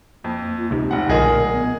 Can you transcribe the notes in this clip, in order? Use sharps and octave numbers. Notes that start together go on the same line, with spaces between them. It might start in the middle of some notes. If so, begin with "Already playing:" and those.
F2 A#3
F4
C#2 C3 D#4
F1 F#5
B1 A#2 D3 G#4 A#4 D#5
B3